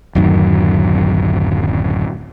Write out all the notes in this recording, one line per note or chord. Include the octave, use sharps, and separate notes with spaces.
D1 F#2 D#3